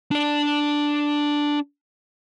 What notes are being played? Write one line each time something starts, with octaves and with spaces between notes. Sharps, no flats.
D4 D5